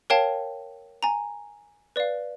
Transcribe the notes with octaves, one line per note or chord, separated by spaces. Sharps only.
A#4 C#5 F5 G5 A5
G#5 A#5
B4 D5 F5